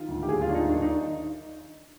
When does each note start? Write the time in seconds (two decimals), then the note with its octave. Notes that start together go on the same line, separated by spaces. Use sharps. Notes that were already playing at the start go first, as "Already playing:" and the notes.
Already playing: D#3 F4
0.08 D2
0.23 G4
0.28 D#2 G#4
0.41 F4
0.49 D#2 D4
0.54 D#4
0.68 D#2 D4
0.82 D#4